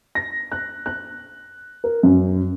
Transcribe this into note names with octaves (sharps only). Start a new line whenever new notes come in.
A#6
F#6
F#6
A#4
F#2